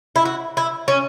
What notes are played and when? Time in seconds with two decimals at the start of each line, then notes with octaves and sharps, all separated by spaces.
0.16 E4
0.25 F#4
0.57 E4
0.88 C#4